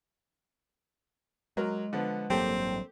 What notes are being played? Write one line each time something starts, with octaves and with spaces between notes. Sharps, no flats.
F#3 G#3 A#4
D3 F3 B3
A1 G2 F#3 A#3 C4 G4 A4 G5